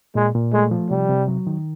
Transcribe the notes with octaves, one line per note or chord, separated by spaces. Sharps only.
A#2 G#3
A#2
G#3 A3
F3
C3 G3
C3
F#3
D#3